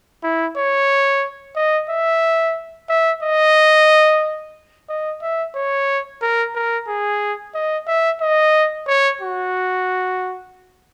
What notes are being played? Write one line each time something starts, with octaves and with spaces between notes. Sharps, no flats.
E4
C#5
D#5
E5
E5
D#5
D#5
E5
C#5
A#4
A#4
G#4
D#5
E5
D#5
C#5
F#4